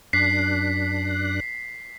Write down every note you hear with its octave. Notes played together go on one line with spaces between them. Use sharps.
F#2 D4 F#6 B6 C7